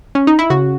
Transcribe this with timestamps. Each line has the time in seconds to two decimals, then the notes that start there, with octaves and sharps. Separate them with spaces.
0.15 C#4
0.27 D#4
0.39 E4
0.50 C#3 F#4